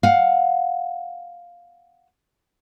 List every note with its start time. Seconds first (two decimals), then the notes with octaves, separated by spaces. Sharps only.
0.03 F5 F#5